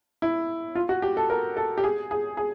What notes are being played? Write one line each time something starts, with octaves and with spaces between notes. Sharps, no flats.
E4
F4
F#4
G4
A4
A#4
A4
G4
G#4
G#4
G#4